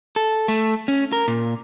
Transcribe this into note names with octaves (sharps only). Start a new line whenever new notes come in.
A4
A3
C#4
A#4
A#2